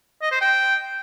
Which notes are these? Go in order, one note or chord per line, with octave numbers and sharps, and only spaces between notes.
D#5
C5
G5